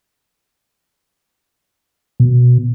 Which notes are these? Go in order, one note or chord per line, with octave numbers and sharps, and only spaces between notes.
B2